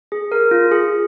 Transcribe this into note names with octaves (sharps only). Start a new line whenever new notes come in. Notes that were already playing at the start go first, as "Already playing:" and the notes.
G#4
A#4
F4
G#4